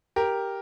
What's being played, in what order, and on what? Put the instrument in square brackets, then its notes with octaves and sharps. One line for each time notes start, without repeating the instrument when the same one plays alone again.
[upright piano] G4 A#4